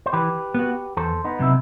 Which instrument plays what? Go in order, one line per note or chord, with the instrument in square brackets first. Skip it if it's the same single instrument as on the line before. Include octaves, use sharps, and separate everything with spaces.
[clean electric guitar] C5
[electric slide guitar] E3 [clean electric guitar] G4 B4
[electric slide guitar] B3 F#4
[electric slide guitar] E2 [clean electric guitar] A4 C5
[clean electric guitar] B3 D#4
[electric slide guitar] C3 F#3 [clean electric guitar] E4